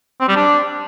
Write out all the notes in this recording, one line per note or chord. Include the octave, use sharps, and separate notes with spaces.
C4
G3
D4